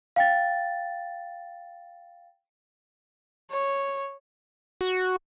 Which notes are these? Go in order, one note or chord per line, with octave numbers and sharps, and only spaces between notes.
F5 G5 A6
C#5
F#4